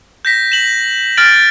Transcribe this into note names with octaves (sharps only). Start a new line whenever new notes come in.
G6 A#6 B6
E7 F#7
F6 G6 A6 D7 F#7